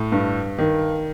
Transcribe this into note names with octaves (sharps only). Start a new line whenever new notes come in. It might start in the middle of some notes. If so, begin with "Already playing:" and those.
Already playing: A2
G2
D#3